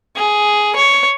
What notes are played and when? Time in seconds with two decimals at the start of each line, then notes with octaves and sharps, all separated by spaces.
0.16 G#4
0.76 C#5